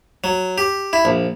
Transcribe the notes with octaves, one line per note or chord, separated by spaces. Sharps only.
F#3
G4
E4
A#1